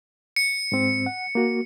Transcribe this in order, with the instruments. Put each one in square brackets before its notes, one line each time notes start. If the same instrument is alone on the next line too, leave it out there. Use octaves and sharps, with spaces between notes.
[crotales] C#7
[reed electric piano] G#2 C4
F#5
A#3 F#4